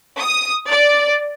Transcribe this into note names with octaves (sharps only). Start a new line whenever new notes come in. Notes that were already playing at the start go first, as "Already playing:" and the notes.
D#6
D5